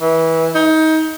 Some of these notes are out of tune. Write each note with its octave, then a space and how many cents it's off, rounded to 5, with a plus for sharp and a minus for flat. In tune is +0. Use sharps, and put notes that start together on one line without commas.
E3 -20
D#4 +25